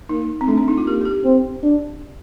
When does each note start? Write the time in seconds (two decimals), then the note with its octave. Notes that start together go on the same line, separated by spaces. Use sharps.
0.09 A#3 D#4
0.41 C4
0.48 A3 D4
0.58 C4
0.68 D#4
0.78 F4
0.86 A#3 G4
1.01 A4
1.05 G4
1.24 C4
1.63 D4